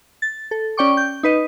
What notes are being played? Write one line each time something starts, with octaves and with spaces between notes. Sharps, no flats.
A6
A4
C#4 D5 G5 C#6 D6
G6
D#4 B4 D#5